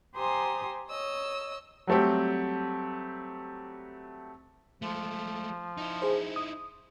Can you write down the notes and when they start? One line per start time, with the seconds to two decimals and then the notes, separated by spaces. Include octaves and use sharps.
0.15 G4 C5 G#5 A#5 C6 D#6
0.88 C#5 D#5 E6
1.87 F#3 G3 A3 C4 G4
4.82 F3 G#3 A3
5.78 D#4 E4
6.02 G#4 C5
6.36 D#6